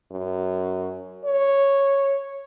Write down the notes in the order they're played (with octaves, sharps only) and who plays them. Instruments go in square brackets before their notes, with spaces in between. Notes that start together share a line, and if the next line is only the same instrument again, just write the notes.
[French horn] F#2
C#5